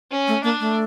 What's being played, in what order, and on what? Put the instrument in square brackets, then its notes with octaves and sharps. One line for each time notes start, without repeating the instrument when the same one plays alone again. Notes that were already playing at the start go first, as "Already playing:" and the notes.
[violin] C#4
[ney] A3
[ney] A#3 [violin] D4
[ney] A3